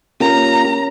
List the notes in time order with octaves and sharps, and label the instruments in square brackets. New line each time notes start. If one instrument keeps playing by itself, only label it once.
[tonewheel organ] A#3 F4 G4 [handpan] C#4 A#4 [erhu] A#5